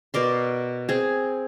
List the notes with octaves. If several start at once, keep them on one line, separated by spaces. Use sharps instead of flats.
B2 A#4 D5 C6
C4 G#4